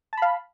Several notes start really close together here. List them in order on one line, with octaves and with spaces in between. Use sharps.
A5 B5 F5